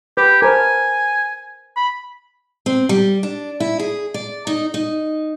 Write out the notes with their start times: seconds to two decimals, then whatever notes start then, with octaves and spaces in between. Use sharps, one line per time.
0.17 G4 B4
0.42 A#4 C5 G#5 A5
1.77 B5
2.66 C4
2.89 G3
3.23 D4
3.60 E4
3.79 G#4
4.14 D5
4.47 D#4
4.74 D#4